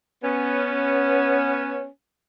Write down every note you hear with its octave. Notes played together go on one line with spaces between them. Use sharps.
B3 C#4